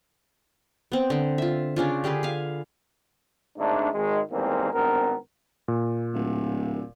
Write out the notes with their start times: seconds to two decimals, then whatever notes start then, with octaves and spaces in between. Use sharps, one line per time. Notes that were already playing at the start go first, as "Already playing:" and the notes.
0.92 B3 C4
1.10 D3 C4
1.38 F4 E5
1.76 C#3 C#4 D4 F4
2.04 D3 G4 G#4 B4
2.23 F5 G#5
3.58 G#1 G#2 A3 D4
3.93 G#1 D#3 G#3
4.31 E2 D#3 G3 G#3 A#3 C4
4.73 G#1 G2 B3 C4 A#4
5.68 A#2
6.14 D1